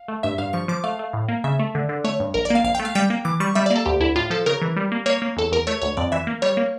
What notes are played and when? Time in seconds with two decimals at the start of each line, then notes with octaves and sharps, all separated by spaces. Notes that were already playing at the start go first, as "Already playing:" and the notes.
Already playing: F5
0.08 A3
0.23 G2 E5
0.38 G2 F5
0.53 F3 C#6
0.68 F3 D6
0.84 A3 F5
0.99 A3
1.13 A2
1.28 A#3
1.44 C#3 E5
1.59 A3
1.75 D3
1.89 D3
2.04 A3 C#5
2.20 G2
2.34 A#1 A#4
2.45 D5
2.50 A#3 F5
2.64 A#1 F5
2.75 A3 G5
2.85 F5
2.95 G3 G5
3.10 A#3
3.25 E3 D6
3.40 G3 C#6
3.55 G3 E5
3.66 A#3 D5
3.76 A4
3.86 D2 G4
4.00 D2 E4
4.16 A2 F4
4.30 F3 A4
4.46 C#3 A#4
4.62 E3
4.76 G3
4.92 A#3
5.06 A#3 C#5
5.22 A#3
5.37 E2 A4
5.51 E2 A#4
5.67 A3 C#5
5.81 D2 C#5
5.97 F2 D5
6.12 E3 E5
6.27 A#3
6.42 G3 C#5
6.57 A#3